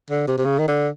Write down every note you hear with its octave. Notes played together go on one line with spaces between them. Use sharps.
D3
C3
C3
C#3
D#3
D3